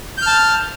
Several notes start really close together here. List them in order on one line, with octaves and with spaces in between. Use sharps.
G6 F6 A5